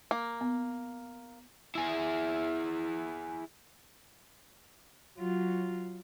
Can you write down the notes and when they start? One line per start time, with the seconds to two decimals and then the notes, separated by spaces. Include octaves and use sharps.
0.11 A#3
0.41 B3
1.75 E4 G#4
5.18 F#3 F4